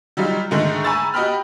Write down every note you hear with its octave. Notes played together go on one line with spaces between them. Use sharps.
F#3 G3 D#4 F4
G#2 D3 D#3 G#3 A3
G#5 A#5 B5 C#6 E6 A6
F#4 G4 D#5 G5 B5 F6